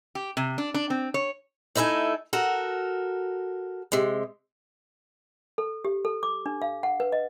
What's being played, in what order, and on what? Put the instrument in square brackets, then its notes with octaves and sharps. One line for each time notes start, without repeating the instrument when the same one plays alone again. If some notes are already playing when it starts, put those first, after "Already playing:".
[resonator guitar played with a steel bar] G4
C3
D4
D4
C4
C#5
[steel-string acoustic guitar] A3 D#4 E4 A4 G#5
F#4 A4 A#4
C3 G#3
[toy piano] A4
G4
A4
D6
D4
F5
F#5
B4
D#5